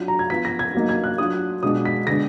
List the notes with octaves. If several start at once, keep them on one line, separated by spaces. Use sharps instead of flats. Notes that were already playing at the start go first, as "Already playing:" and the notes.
Already playing: F#3 D4 F4
A#5
G#6
F3 B3 F4 B6
A#6
G#6
F#3 A#3 D#4
G#6
F#6
F#3 D4 F4 D#6
B2 G#3 D4 F4 D#6
B6
D3 G#3 B3 D4 A#6